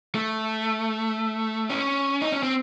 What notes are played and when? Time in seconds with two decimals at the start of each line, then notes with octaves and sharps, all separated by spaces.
0.15 A3
1.69 C#4
2.22 D#4
2.32 C#4
2.43 C4